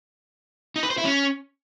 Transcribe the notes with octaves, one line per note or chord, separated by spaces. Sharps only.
D#4
B4
C5
E4
C#4